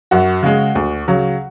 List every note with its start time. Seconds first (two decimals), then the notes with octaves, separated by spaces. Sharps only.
0.11 F#2 F#4
0.43 C#3 G#3
0.75 D2
1.08 C#3 F#3